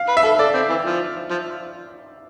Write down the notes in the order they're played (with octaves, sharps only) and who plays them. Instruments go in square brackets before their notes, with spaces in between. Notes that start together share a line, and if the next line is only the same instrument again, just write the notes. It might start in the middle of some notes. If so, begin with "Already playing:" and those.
Already playing: [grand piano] F5
[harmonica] B4
[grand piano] E5
[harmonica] A4
[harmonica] A4 [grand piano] D5
[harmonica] C4
E3
F3
F3